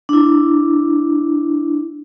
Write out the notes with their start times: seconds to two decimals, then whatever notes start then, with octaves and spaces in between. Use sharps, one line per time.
0.09 D4 E4